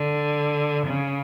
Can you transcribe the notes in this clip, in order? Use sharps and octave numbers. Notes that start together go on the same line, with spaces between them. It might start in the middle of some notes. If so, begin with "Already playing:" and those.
Already playing: D3
C#3